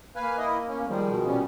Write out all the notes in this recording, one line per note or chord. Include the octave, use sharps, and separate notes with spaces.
A#3 B4 F5 G#5
E4 D#5
C#4
D#3 F3 G3 G#3
B2
A#2 G3 C#4